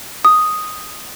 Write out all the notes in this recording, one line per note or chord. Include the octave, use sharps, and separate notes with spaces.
D#6